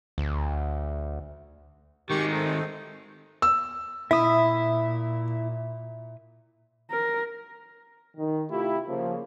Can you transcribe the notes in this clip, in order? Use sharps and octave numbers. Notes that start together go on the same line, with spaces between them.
D2
D#3 G#3 G4 C#6
A3 C4 D#4
E6
A#2 E4 E5 D#6
A#4
D#3
C3 A3 E4 F4 G4
C#3 F3 A#3